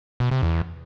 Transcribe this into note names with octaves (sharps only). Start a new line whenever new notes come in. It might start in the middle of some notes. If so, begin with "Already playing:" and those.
B2
C3
E2